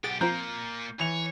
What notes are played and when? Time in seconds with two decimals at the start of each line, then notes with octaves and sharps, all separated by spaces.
0.04 B1 G4 G#4 F#5 A6
0.21 A#2 F3 A#3 C4 F4 A#5 G6
1.00 E3 C#5 F7